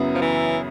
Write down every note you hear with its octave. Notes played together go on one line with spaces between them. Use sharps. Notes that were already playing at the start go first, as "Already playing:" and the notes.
Already playing: F#2 C#3 F#3 B3 E4
F3
E3